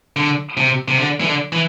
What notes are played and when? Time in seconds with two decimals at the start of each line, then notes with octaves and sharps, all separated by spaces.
0.16 D3
0.57 C3
0.88 C3
0.98 D3
1.21 E3
1.26 D3
1.52 E3